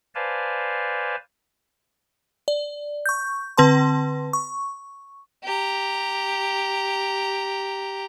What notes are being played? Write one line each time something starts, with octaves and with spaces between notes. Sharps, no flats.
B4 C5 D5 F5 G#5 A5
D5
C#6 G6
D3 C4 B4 A5 C6
C#6
G4 A#5